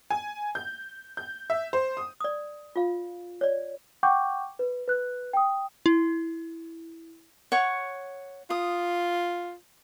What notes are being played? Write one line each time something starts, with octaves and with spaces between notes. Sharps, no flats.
G#5
G6
G6
E5
C5
D#6
D5 D#6
F4 F5
C#5 D5
F#5 G5 C#6 D6 G6
B4
B4 F#6
G5 D#6
E4
C#5 F#5 C#6
F4 D#6